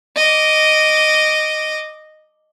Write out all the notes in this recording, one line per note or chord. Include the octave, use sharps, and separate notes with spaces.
D#5 D6